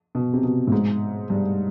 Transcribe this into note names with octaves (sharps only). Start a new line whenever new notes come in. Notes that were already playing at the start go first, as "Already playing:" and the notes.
B2
C3
B2
A2
G#2
G2